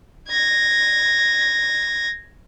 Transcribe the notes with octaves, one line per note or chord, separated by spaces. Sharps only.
G#6 A#6